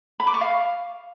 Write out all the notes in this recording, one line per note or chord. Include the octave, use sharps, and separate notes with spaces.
B5
D6
C#6
F5